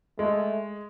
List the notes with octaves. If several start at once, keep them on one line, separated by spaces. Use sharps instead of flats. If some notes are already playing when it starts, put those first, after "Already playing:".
G#3 A3